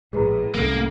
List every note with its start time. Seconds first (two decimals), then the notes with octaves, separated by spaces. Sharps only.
0.13 A#1 A2 G#3 G#4 B4 A#5
0.54 C2 F#2 A#3 A4 A#4